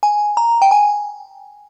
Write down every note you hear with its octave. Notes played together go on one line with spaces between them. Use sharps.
G#5
A#5
G5
G#5